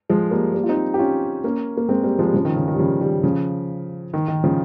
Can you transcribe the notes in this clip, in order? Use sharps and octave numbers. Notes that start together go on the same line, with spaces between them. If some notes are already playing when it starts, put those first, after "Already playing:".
F3 G#3
G3 A#3
G3 A#3
F4
C4 D#4
G4
C#4 F4
A#3 C#4
A#3
G#3 C4
G3 A#3
F3 G#3
G3
C#3 F3
D#3
C#3
D#3
G3
C#3 F3
D#3 G3
C#3 F3
D#3
D#3
C#3 F3